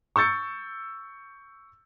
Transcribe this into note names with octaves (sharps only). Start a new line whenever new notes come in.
C#6 E6 G6 A6 C#7